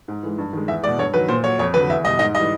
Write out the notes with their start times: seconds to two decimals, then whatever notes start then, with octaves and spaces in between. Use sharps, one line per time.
0.08 G#2
0.23 E3 G#3
0.38 G2
0.53 D#3 G#3
0.68 E2 E5
0.83 G#3 D5
0.88 B2
0.98 G2 C#5
1.13 D#3 F#3 B4
1.28 A#2 C5
1.44 F#3 C#5
1.59 F2 C#5
1.74 D3 F#3 B4
1.89 E2 E5
2.04 B2 G3 D#5
2.19 G#2 D#5
2.35 E3 G3 D#5